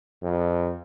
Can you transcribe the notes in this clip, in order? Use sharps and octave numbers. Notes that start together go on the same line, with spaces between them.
F2